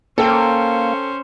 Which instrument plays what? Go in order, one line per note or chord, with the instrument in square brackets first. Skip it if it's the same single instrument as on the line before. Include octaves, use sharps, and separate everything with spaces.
[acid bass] A#3 [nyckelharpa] C#4 C5 [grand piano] A4 G5